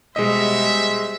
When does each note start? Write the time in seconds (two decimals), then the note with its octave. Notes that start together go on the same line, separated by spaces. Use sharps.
0.16 B2 G3 G#3 C5 D#5 E5